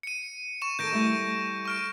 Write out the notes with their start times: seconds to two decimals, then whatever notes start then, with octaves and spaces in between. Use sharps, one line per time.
0.03 C#7 D#7
0.62 C#6 D#7 E7
0.79 D#3 A4 G6 A#6 D7
0.92 G3 A3 E4
1.65 C#6 F6 D7